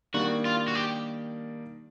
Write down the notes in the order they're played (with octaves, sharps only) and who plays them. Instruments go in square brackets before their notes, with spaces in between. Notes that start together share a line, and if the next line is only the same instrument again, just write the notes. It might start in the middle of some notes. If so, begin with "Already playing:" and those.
[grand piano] D#3 G3 A#3 D4 [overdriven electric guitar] F#4
[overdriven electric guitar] F4
F#4
G4